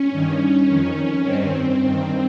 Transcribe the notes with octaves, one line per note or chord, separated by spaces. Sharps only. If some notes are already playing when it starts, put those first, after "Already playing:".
Already playing: C#4
G2 D#3
F2 D#3
G2 D#3 C4
G2 D#3